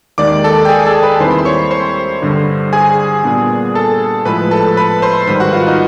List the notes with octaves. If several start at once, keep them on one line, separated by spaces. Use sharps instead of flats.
D#2 D#3 G#3 D5 D6
A4 A5
G5
G#4 G#5
A4 A5
B4 B5
D#2 D#3 G3 C4 E4 C5 C6
B5
C6
C#5 C#6
C5 C6
G2 D3 G3
G#4 G#5
A#2 G3 B3 D4
A4 A5
A2 F3 G#3 B4 B5
A4 A5
B4 B5
C5 C6
G#2 D#3 G3 B4 B5
F#4 F#5
F4 F5
D#4 D#5